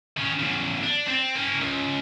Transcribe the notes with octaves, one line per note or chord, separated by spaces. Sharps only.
D#3 C#4
E2 C#3
D4
C4
A#3 C#4
C#2